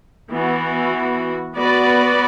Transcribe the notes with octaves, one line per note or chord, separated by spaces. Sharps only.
E3 B3 F#4
B3 F#4 B4 D5